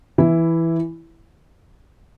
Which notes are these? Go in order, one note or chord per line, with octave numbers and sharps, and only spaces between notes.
E3 E4